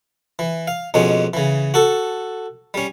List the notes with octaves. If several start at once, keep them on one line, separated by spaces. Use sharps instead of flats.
E3
F5
F2 B2 G#3 C#4
C#3 E3
F#4 A4
G3 C#4